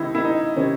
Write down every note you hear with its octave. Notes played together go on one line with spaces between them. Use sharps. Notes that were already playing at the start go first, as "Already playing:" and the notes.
Already playing: C#2 C3 D#3 D#4 E4
E4
D#4
C3 D#3 C#4